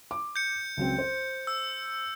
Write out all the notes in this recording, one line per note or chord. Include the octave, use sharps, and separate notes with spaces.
D6
G6 C#7
C#2 F#3 C4
C5
E6